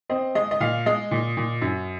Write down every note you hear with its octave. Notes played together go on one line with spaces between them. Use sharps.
C4 D#5
G#3 D#5
D#5
A#2 F5
G#3 D#5
A#2
A#2
F#2